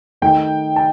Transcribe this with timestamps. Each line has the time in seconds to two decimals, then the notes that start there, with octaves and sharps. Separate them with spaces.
0.22 D#3 A3 D#4 G5
0.76 A5